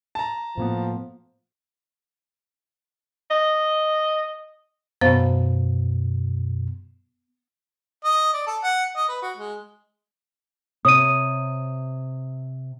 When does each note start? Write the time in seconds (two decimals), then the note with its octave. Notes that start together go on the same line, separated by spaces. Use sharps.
0.15 A5 A#5
0.58 A2 F3 A#3 B3
3.31 D#5
5.01 F#2 B2 B3 C5 F5
8.05 D#5
8.34 D5
8.47 A4
8.64 F#5
8.96 D#5
9.09 B4
9.22 F#4
9.37 G#3
10.85 C3 C#5 D#6 D#7